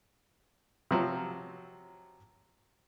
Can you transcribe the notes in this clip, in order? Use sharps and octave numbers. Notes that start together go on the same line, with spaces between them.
C3 F3 F#3